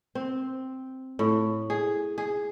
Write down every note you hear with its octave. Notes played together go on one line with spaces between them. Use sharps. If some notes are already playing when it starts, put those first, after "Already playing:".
C4
A2
G#4
G#4